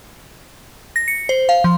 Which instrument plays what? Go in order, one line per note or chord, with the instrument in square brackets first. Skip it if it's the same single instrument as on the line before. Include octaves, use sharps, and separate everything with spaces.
[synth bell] A#6
C#7
C5
F5
F3